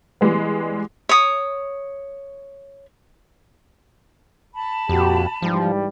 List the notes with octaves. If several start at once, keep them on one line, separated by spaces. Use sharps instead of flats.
E3 G3 G#3 B3
C#5 D#6
A5 B5
F2 A#2 F#4 G4
G#2 E3 F3 G3